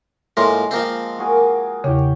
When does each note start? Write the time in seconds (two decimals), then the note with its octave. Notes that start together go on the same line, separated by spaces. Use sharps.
0.37 A2 F3 G#3 A#3 C6
0.71 F3 A#3 C4
1.18 F#4 G#4 A#4
1.37 D6
1.84 E2 C#3 G4 C#5 G5